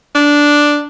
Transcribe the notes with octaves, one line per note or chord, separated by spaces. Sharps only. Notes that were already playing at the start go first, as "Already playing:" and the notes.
D4